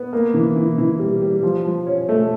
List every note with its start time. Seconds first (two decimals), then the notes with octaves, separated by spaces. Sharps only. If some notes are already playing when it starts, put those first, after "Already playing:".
Already playing: B3
0.13 A#3
0.34 E3
0.56 E3
0.78 E3
0.99 G3
1.22 G3
1.43 F3
1.65 F3
1.87 C#4
2.09 A3